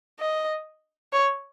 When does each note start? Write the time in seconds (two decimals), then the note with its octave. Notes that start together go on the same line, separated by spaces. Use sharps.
0.20 D#5
1.13 C#5